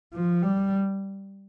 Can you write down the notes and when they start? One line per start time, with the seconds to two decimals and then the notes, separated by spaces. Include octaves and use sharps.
0.14 F3
0.42 G3